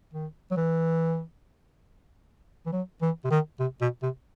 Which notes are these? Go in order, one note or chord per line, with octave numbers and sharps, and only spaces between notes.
D#3
F#3
E3
E3
F#3
E3
C3
D#3
C3
B2
C3